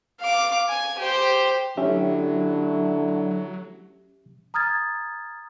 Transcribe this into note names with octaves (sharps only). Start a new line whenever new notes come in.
F5 D6
G#5
G4 C5
D3 F#3 A3 C#4 E4 G4 E5
A#5 D#6 F6 G#6 A6